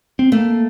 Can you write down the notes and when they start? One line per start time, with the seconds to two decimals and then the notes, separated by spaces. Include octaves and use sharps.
0.19 C4
0.32 A3 A#3